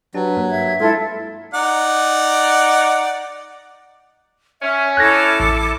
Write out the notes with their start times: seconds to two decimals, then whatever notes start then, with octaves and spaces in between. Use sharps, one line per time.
0.14 F#3 D4 G4 B4 A5
0.37 G2 A#3
0.50 E5 G#6
0.68 G#6
0.80 G#3 E4 F4 A4 G#6
1.54 D#4 D5 F#5
4.62 C#4 E5
4.97 E4 A4 D6 F#6 G#6 A#6
5.40 A1